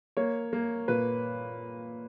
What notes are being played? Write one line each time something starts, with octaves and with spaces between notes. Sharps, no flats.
A#3 C#5
A#3
A#2 B4